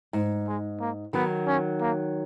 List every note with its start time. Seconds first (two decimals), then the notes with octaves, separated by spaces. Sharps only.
0.13 G#2
0.47 G#3
0.80 A#3
1.13 D#3 F#3 B3
1.47 C#4
1.81 A#3